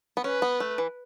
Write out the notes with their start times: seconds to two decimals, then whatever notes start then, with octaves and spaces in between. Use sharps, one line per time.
0.17 B3
0.24 C#4 B4
0.42 B3
0.60 A3
0.78 E3